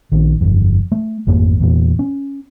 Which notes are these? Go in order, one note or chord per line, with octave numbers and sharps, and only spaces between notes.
A#1 D#3
G1 F2
A3
G#1 F2 A3 A#3
E2 A#2
C#4